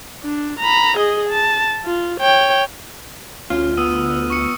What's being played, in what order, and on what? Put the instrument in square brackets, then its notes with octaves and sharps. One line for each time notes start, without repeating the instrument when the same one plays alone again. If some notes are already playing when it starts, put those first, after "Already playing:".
[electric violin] D4
A#5 B5
G#4 D#5
A5
F4
C#5 G5
[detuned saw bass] D2 [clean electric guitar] C#4 [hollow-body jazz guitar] F4 [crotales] F6
[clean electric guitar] B3 [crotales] D#6 E6 D#7
[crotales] C#6 C#7